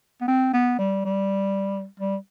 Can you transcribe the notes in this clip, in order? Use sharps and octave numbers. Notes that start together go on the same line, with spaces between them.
B3
C4
B3
G3
G3
G3